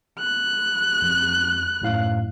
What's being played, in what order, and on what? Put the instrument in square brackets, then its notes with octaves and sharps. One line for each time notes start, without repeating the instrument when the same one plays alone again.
[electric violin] F#6
[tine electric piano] F2
F#2 A2 F5